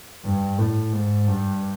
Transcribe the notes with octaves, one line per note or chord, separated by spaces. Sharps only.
G2
A2
G#2
G2